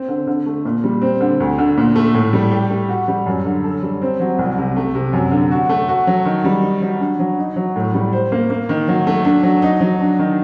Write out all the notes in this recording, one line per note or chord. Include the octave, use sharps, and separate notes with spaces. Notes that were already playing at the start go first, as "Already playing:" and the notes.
Already playing: C4
D3
D3
A3
A#2
G3
C4
D3
D2
D3
A#2
A3
A2
G3
G4
A3
F#4
G3
F#2
D3
A4
G3
C4
F#3
C2
C3
A3
C3
F#2
D3
F#4
A3
F#4
F#3
D#3
G3
D#4
F#3
D4
F#3
D#4
F#3
A2
G3
C5
A#3
A#3
D#3
F#3
A3
D4
F#3
D#4
F#3
D4
D#3